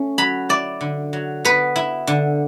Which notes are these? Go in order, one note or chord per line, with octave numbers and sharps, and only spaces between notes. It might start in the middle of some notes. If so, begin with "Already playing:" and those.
Already playing: A3 C#4
F#3 B5
E4 D5
D3
F#3
B3 B4
E4
D3